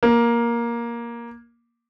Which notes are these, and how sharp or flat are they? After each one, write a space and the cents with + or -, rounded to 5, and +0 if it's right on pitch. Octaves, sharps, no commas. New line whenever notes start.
A#3 +10